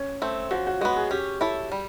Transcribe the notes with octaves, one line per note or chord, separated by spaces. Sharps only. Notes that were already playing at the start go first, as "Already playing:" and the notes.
Already playing: C#4
A3 C4
F3 F#4
F#4
G#3 B3 F#4
G#4
C#4 G4
E4 A4 C#5
G3